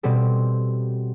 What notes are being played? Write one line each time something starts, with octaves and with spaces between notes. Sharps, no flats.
B2 G3 C4 G4 A4